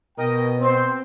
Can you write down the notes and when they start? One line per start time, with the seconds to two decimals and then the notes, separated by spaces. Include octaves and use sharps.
0.18 B2 A#4 D#5 G5
0.60 C4 C5